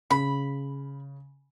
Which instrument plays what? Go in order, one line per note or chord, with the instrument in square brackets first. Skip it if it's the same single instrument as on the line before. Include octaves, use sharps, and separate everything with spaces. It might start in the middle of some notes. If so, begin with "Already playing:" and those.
[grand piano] C#3 [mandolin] B5